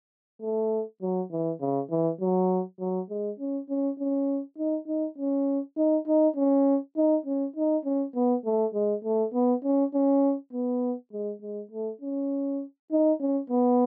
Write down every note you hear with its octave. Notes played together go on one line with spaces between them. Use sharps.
A3
F#3
E3
C#3
E3
F#3
F#3
G#3
C#4
C#4
C#4
D#4
D#4
C#4
D#4
D#4
C#4
D#4
C#4
D#4
C#4
B3
A3
G#3
A3
B3
C#4
C#4
B3
G#3
G#3
A3
C#4
D#4
C#4
B3